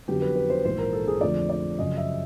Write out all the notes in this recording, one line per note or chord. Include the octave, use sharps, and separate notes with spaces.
F2 D3 F#3 B3 G4
B4
B4
C5
A#1 G#2 E3 C5
A#4
A4
G#4
F2 D3 F3 A3 D5
D5
F#2 C#3 F3 D#5
E5